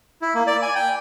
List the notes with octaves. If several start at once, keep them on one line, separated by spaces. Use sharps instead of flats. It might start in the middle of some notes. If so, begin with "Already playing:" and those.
E4
A#3
D5
G#5
G5